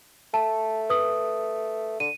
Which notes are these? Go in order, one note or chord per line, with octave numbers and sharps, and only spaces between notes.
A3 A5
B4 D#6
D3 D#7